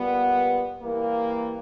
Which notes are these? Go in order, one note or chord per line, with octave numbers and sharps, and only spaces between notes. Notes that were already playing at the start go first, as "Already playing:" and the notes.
Already playing: A#2 G3 B3
E3 G3 A#3